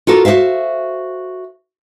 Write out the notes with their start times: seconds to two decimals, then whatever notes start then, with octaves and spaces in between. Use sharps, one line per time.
0.07 F4 F#4 A4 A#4
0.25 F#4 G4 C5 E5 F5